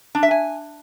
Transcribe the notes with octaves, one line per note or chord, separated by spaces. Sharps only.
D4
E5
G#5